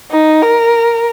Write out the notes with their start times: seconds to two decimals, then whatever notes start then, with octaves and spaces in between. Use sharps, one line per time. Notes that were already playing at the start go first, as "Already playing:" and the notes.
0.11 D#4
0.43 A#4